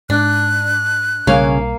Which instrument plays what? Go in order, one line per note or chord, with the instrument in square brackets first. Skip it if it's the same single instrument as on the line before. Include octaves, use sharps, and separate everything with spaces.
[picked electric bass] G#2 [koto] D4 [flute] F#6
[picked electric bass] B1 G3 [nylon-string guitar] C#3 C#5 G#5 [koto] A#3 F5